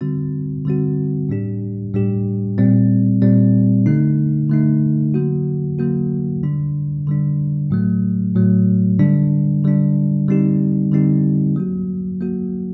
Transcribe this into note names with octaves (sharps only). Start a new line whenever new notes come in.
D3 G3 C4 F#4
D3 G3 C4 F#4
A2 G3 D4 G4
A2 G3 D4 G4
A#2 G3 C4
A#2 G3 C4
D3 A3 D#4
D3 A3 D#4
D3 F#3 A#3 F#4
D3 F#3 A#3 F#4
D3 G3 D4
D3 G3 D4
A2 F#3 A3
A2 F#3 A3
D3 G3 D4
D3 G3 D4
D3 G3 C4 D#4 G4
D3 G3 C4 D#4 G4
F#3 A#3 F#4
F#3 A#3 F#4